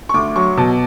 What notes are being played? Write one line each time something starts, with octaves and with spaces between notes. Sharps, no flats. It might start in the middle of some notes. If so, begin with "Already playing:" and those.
C#6
D2 D6
F#3 C#6
B2 A5